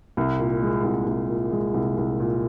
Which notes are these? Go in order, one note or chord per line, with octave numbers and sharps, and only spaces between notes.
C2
A#2
G#3
C2
C2
A#2
G#3
C2
C2
A#2